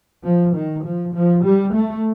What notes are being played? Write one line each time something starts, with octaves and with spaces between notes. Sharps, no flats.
F3
D#3
F3
F3
G3
A3